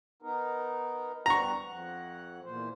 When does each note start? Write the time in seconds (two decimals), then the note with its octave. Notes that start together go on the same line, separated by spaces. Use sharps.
0.22 B3 D#4 A#4
1.26 G3 B3 F#5 A#5 C#6
1.67 F2 F#5
2.45 E2 A#2 C5